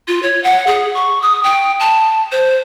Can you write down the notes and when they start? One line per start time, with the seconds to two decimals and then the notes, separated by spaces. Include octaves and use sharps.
0.08 F4
0.22 C#5
0.43 F#5
0.67 G#4
0.94 C#6
1.22 D#6
1.43 G5
1.80 A5
2.31 C5